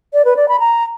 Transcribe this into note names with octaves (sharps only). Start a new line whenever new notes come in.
D5
B4
D5
B5
A#5